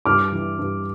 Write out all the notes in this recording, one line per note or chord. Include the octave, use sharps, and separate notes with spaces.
G2 D6 F6
E3
G2